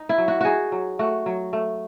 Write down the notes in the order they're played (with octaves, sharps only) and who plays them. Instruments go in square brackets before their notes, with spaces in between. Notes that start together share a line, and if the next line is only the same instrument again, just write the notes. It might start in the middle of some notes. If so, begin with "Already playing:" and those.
Already playing: [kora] D#4
E4
F#3
F#4
D#4 F#4 G#4
F#3
A3 F#4
F#3
A3